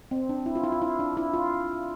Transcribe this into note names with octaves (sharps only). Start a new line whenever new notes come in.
C4
D4
E4
F4
E4
F4
E4
D4
E4
F4